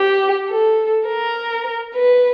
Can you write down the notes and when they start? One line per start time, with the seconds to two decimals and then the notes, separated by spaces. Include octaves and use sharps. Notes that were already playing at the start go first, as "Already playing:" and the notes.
Already playing: G4
0.49 A4
1.07 A#4
1.96 B4